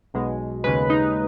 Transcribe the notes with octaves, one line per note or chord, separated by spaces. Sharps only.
B1 B2 G#3
D#2 C#3 G#3 B4
D#4